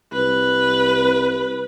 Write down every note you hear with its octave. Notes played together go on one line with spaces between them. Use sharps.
C2 B4